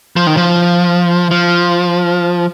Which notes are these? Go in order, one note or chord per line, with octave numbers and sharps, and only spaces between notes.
F3
D#3
F3
F3